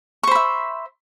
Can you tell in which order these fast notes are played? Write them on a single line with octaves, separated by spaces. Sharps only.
C#6 C5 B5 E5